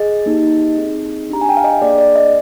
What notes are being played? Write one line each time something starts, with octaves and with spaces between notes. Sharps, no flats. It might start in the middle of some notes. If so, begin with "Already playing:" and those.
Already playing: G#4 D#5
A#3 D#4 G4
C4 D#4 G#4
D4 G4 A#5
G#5
G5
F5
D#5
A#3 D4 G#4 D5
D5
D#5